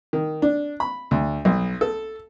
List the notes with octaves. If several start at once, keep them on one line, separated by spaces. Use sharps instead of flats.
D#3
D4
B5
D2
B1
A4